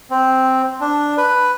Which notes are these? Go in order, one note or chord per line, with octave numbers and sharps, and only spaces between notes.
C4
D4
B4